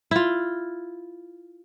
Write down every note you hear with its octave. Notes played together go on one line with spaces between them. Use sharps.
E4 F4